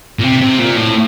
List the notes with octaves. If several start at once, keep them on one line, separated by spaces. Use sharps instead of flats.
A#2
C3
C3
A#2
A2